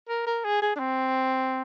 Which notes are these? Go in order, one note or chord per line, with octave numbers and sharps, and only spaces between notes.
A#4
A#4
G#4
G#4
D4
C4